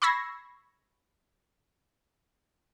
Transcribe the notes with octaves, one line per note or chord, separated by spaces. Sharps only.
B5 C#6 E6 G#6 A#6 C7